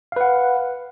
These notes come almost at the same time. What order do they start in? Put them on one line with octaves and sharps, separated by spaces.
F5 B4 F#5